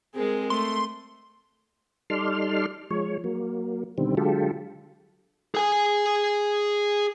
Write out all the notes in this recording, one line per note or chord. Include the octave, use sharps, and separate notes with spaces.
G#3 C4 G#4 A#4
A3 C6
G3 D#4 A4 D5 C6 F6
F3 G#3 C#5
F#3 A#3
B2 D3 D#3 G3 C4
D3 F#3 G#3 F4 G4 A4
G#4 G#5